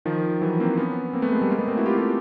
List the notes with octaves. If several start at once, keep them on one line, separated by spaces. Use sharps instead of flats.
D#3 F3
E3 F#3
A#3 C4
B3 C#4
A#3 C4
A3 B3
G#3 A#3
G3 A3
G#3 A#3
A3 B3
A#3 C4
E4 F#4
F4 G4
G4 A4